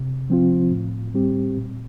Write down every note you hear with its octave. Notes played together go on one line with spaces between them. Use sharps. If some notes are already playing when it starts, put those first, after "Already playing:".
Already playing: C3
F3 C4 F4
A2
G3 C4 G4
A#2